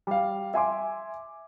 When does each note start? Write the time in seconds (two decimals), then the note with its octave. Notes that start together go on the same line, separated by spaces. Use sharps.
0.07 G3 F5
0.54 E5 G#5 C6 D6